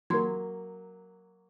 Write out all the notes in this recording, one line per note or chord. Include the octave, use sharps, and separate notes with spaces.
F#3 A#3 C6 G#6